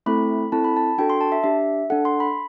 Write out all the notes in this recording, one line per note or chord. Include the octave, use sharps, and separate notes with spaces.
A3 C4 E4 A4 B5
C4 E4 A4 A5
B5
A5
D4 F#4 A4 G5
C6
A5
E5
D4 G4 E5
D4 A4 F#5
C6
B5